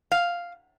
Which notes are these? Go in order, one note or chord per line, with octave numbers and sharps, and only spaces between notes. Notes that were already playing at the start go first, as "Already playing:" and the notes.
F5